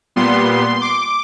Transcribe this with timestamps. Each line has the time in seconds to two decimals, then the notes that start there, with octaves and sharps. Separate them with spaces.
0.16 A#2 G3 B3 C6
0.81 D6